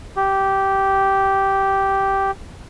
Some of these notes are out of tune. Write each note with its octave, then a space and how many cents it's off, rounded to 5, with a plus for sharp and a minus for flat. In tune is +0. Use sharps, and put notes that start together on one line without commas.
G4 -10